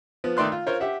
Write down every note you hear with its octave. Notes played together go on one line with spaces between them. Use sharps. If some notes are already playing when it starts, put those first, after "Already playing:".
F3 B3
D#3 A3 D5 C6 F#6
F4
F4 A#4 C5 C#5
G4 E5 F#5